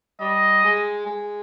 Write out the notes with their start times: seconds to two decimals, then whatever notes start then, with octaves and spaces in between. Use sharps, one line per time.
0.21 G3 D#5
0.64 G#3
1.06 G#3